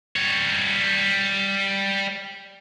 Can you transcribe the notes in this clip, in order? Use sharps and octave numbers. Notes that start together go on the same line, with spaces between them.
G3 C#5